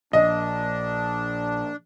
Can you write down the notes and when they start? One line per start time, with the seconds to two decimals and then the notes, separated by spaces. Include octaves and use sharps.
0.13 A#1 D4 D#5